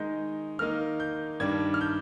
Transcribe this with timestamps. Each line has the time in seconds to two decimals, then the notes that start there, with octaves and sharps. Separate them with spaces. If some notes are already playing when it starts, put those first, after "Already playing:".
Already playing: D#3 G#3 D#4 G6
0.59 D#3 A#3 D#4 F6
1.00 G6
1.40 G2 D#3 G3 D4 G#6
1.74 F6
1.81 G6